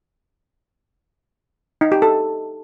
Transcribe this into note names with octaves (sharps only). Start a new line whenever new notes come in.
D#4
G4
A4